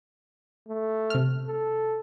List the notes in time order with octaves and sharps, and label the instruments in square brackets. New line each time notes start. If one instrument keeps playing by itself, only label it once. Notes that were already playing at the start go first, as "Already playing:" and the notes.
[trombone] A3
[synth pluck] C3 F6
[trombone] A4